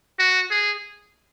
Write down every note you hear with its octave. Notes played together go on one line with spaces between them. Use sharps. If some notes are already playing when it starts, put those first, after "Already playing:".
F#4
G#4